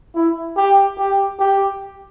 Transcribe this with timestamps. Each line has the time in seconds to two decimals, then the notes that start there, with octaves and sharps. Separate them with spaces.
0.15 E4
0.57 G4
0.98 G4
1.40 G4